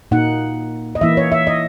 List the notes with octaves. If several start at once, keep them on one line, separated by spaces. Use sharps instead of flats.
A#2 A#3 D#4 F#5
D#5
E3 A#3 E4 E5
C#5
E5
D#5